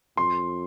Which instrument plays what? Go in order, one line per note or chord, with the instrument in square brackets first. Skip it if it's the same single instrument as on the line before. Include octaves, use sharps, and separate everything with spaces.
[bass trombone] F2 [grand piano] C6